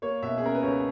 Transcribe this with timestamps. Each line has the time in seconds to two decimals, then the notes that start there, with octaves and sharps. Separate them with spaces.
0.02 A#3 C#5
0.22 B2 E5
0.38 G#4
0.42 C#4 A#4
0.55 B4
0.63 C#2 C#5